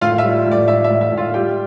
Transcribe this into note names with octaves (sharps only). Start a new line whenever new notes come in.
A2 F4 F5
E5
G3
A2
D5
A2 E5
E5
A2
E5
A2
F4 F5
G3 G4 G5